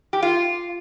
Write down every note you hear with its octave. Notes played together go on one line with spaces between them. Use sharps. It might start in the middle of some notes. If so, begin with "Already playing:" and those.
G4
F4